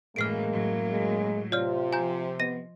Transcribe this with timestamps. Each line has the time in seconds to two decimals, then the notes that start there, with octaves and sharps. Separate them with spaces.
0.16 F#2 A2 E3 G#3 A#3 F6 C7 D7
0.52 A2 F#3
0.91 G#3
1.52 C3 F4 C#5 D5 F6
1.93 F3 G#5 A#5 G6
2.39 B3 D#5 A#6 D#7